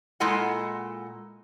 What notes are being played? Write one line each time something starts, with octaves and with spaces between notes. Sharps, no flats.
A#2 G#3 E4 A4 D#5 F#5